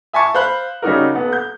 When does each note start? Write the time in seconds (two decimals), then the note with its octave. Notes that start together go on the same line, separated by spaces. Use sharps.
0.13 E5 G#5 A5 C#6
0.35 C5 F5 B5 F#6
0.82 C#3 G3 D#4 F#4 A#4
1.15 D#1 B3 F#5
1.32 G6